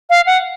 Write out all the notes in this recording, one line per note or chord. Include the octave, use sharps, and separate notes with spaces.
F5
F#5